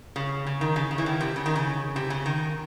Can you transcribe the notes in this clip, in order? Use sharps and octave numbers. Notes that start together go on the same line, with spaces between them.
C#3
C#3
D#3
C#3
C#3
E3
D#3
C3
C#3
D#3
C#3
C3
C#3
D#3